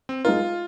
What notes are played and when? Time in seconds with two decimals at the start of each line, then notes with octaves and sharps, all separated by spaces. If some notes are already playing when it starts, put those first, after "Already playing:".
0.09 C4
0.25 G#3 D#4 F4 A#4